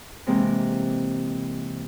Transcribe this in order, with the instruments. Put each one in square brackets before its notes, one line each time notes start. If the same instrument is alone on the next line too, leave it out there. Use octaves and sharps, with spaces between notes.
[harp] C3 E3 G#3 A#3 C4